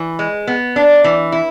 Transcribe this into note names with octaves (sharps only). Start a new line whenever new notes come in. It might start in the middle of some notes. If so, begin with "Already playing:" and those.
Already playing: E3
G#3
B3
D4
E3
E4